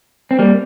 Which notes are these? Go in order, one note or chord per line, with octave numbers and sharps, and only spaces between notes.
C4
G3 A#3